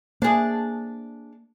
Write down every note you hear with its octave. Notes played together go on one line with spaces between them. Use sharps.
A#3 D4 G#4